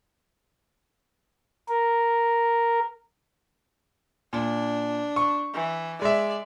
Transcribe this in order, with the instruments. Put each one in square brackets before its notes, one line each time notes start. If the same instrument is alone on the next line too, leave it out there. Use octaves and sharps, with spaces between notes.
[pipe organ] A#4
[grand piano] A#2 [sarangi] D4
[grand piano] C#6
[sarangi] E3
[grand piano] G#3 E5 [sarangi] D5